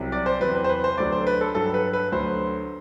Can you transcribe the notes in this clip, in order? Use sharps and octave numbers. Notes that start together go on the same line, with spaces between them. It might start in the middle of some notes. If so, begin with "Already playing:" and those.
Already playing: C2 C3 F#3
D5
C5
E2 C3 F#3 B4
B4
C5
B4
C5
D2 D3 F#3 D5
C5
B4
A4
G2 F#3 A4
B4
B4
D2 D3 F#3 C5